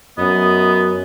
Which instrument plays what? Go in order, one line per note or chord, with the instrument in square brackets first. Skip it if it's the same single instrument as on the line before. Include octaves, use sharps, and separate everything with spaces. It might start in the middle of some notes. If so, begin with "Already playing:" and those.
[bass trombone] F#2 [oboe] B3 [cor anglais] D#5